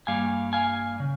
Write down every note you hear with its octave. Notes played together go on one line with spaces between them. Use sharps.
G2 G3 A#3 F5 G#5
F5 G#5
C#3